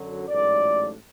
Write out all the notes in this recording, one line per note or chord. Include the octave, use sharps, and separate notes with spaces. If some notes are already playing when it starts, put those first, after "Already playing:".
Already playing: F#2 D3 F#3
A1 G#2 F#3 A3 D5